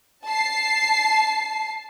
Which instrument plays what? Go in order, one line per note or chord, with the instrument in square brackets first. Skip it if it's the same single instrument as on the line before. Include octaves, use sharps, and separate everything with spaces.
[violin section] A5 C7